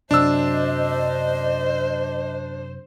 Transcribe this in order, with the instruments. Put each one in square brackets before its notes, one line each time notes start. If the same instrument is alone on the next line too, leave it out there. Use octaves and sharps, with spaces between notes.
[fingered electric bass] F#2 C3 F#3 [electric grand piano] D4 E6 [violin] C5 [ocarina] D#5